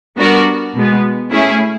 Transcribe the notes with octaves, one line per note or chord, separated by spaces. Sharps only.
G3 B3 D4 F#4 A#4
B2 G#3 B3
A3 C#4 E4 G#4